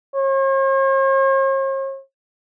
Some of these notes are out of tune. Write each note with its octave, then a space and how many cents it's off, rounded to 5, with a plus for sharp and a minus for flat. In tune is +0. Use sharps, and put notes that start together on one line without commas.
C#5 -45